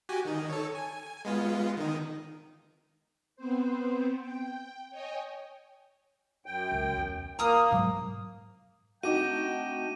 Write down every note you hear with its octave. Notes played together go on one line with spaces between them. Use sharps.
F#4 G4 G#5
D#3 D#4
A4 C#5
G#5
G#3 B3 F4
D#3 D#4
B3 C4 C5
G5
C#5 D#5 G5 G#5
F#2 G5
C#2
E2
A#3 F4 A#5 D#6 F6
G#2 F#3
A3 C4 D4 D#4 F#4 G5 D6 D#7